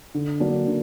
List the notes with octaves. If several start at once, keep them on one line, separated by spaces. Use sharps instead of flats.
D3
F#3 A#3 D4
D3